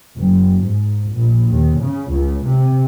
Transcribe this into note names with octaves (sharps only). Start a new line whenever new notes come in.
F#1
G#2
A#1
D#2
C#3
C#2
C3